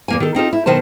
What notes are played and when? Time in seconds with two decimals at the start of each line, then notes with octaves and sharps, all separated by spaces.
0.08 E2 A#3 G#5
0.20 D#3 A4
0.35 C4 D#4 F4 A4
0.53 E4
0.66 B2 D#3 F#3 C5 A5